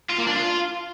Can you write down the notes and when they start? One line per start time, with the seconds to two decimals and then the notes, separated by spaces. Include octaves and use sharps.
0.09 F4
0.18 A#3
0.27 D4
0.36 F4